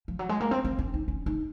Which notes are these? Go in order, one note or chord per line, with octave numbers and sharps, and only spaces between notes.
F3
F#3
G#3
A#3
C4
C4
C#4
D#4
C#4
D#4